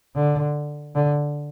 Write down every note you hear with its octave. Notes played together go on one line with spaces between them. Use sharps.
D3
D3